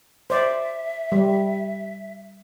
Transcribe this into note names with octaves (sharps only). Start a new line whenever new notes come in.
C5 D5 E5
G3